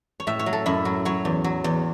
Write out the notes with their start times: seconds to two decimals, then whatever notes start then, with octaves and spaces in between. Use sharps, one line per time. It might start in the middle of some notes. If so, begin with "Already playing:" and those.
0.20 C#5
0.27 A2 E5
0.39 C#5
0.46 F#3
0.53 A4
0.66 F#2 E4
0.85 F#3
1.05 F#3 C#5
1.25 E2
1.44 F#3
1.64 E2